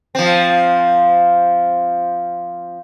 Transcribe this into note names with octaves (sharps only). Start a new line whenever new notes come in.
F3 C4